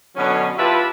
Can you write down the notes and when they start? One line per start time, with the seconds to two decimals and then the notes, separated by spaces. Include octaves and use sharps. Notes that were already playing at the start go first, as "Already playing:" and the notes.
0.16 B2 D3 F#3 C#4
0.58 E4 F4 G4 B4 E5 A5